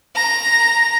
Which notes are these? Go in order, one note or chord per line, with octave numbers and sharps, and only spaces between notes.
A#5